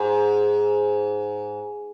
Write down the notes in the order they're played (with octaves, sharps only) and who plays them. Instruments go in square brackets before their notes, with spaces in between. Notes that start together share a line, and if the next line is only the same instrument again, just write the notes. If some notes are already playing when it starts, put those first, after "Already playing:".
Already playing: [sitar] G#2